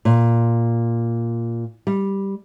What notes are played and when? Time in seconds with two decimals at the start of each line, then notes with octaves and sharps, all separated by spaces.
0.05 A#2
1.87 G3